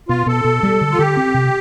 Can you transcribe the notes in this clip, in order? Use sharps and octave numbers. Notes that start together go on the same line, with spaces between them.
B2 F4
B2 A4
B2
G3
D3
F4
D3 G4
C4
C3